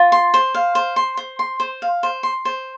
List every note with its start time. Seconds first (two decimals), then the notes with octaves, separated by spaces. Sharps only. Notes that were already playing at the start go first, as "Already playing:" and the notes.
Already playing: F4
0.12 C6
0.34 C5
0.55 F5
0.75 C5
0.96 C6
1.17 C5
1.39 C6
1.60 C5
1.82 F5
2.03 C5
2.23 C6
2.45 C5